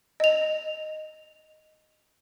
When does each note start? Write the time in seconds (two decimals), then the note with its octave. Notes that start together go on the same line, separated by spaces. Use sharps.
0.20 D#5 F7